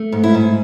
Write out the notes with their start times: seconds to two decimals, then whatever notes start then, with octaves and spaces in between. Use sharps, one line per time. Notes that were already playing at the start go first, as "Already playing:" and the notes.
Already playing: A3
0.12 G#2
0.24 E4
0.35 G#2